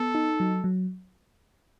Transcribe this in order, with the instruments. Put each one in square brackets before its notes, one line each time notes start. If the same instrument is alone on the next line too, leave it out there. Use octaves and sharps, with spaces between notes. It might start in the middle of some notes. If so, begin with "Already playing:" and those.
Already playing: [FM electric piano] B3 [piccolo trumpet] A4
[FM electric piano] D#4
F#3
F#3